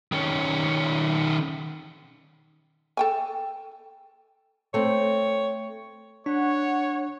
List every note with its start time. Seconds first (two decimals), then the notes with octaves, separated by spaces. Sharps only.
0.12 D#3 C#4
2.97 A4 G5 G#5
4.74 A3 C4 C#5
6.26 D4 C#5 F#5